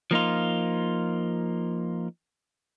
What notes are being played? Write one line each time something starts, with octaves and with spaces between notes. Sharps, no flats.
F3 A#3 D#4 F4